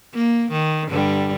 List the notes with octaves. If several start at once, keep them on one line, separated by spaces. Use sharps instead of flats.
A#3
D#3
G2 D3 G3